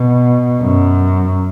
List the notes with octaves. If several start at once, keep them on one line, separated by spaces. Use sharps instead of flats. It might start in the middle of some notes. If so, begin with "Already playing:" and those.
Already playing: B2
F#2